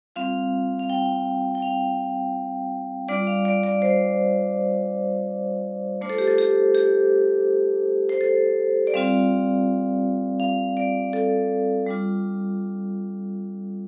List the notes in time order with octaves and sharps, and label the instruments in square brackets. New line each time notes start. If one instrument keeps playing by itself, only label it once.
[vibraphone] G3 C4 F4 F5
F5
G5
G5
F5
G3 D4 F4 D5
F5
D5
D5
C5
A3 D4 F4 C5
A4
G4
A4
G4
G4
C5
A4
D5
G3 C4 F4 F5
F5
D5
A4
G3 D4 F4